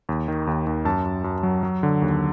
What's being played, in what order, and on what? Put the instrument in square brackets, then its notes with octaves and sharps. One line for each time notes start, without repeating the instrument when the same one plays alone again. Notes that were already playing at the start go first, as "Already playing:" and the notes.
[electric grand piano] D#2
D#3
D#2
D#2
F#2 A5
F#2
F#2
F#3
F#3
D3
D#2